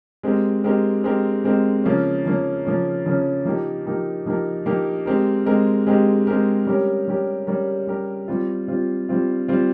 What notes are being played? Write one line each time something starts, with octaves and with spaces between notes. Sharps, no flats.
G#3 C4 G4 A#4
G#3 C4 G4 A#4
G#3 C4 G4 A#4
G#3 C4 G4 A#4
C#3 F3 A#3 C#4
C#3 F3 A#3 C#4
C#3 F3 A#3 C#4
C#3 F3 A#3 C#4
F3 A#3 D#4 G4 A#4
F3 A#3 D#4 G4 A#4
F3 A#3 D#4 G4 A#4
F3 A#3 D#4 G4 A#4
G#3 C4 G4 A#4
G#3 C4 G4 A#4
G#3 C4 G4 A#4
G#3 C4 G4 A#4
G3 C#4 G4 A#4
G3 C#4 G4 A#4
G3 C#4 G4 A#4
G3 C#4 G4 A#4
G3 C4 F4
G3 C4 F4
G3 C4 F4
G3 C4 F4